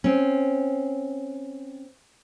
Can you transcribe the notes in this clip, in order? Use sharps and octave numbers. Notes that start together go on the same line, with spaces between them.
C4 C#4